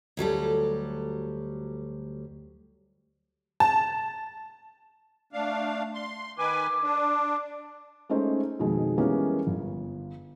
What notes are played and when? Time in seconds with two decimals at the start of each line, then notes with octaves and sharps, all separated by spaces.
0.17 D2 F#3 G3 A4
3.60 A5
5.33 A3 D4 F5
5.94 C6
6.38 D#3 B4 G#5 D6
6.83 D4
8.09 G#3 A3 C#4 D#4 C5
8.59 F2 B2 D#3 G#3
8.98 E3 G3 G#3 A#3 B3 C#4
9.47 G1